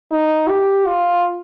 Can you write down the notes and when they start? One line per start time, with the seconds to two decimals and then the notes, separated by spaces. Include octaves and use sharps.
0.11 D#4
0.49 G4
0.86 F4